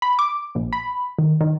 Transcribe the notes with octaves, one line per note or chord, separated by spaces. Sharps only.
B5
D6
A#1
B5
D#3
D#3